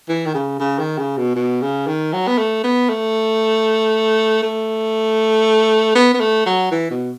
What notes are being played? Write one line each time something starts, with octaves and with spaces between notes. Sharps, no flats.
E3
D#3
C#3
C#3
D#3
C#3
B2
B2
C#3
D#3
F#3
B3
A3
B3
A3
A3
B3
B3
A3
F#3
E3
B2